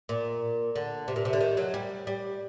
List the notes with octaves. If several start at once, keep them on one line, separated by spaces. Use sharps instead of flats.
A#2
D3
C3
A#2
C3
D3
D#3
F#3
G3
G3